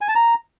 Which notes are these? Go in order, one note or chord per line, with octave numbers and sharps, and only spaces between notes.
G#5
A5
A#5